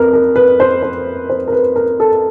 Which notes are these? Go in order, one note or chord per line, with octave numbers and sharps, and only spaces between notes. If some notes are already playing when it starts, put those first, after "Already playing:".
Already playing: F2 A#4 B4
A#4
B4
C5
C5
C5
A#4
B4
A#4
A4